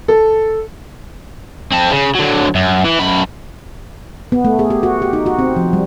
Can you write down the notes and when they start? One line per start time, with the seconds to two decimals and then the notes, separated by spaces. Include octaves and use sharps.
0.08 A4
1.72 C4 A4
1.91 C#3
2.15 D3 F#3
2.55 F#2
2.84 E3
2.99 F#2 B5
4.32 B3
4.45 A3
4.59 G#4
4.70 G4
4.83 F#4
5.02 G4
5.13 D#4
5.26 F#4
5.39 C4
5.56 F3
5.73 G3